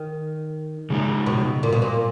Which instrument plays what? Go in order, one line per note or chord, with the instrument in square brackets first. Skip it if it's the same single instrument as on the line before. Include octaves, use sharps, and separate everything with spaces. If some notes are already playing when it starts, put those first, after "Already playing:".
Already playing: [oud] D#3
[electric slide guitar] C#3 G#3 D#4
[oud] B2
A#2
B2
A#2